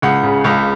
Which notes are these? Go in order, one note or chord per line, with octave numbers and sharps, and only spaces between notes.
C#2 F#5
C#3
C#2